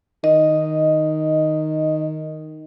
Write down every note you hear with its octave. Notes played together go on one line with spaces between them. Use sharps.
D#3 D#5